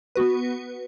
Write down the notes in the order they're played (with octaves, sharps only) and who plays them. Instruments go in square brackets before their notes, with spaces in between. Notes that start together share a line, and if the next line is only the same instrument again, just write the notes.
[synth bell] B3 F#4 B4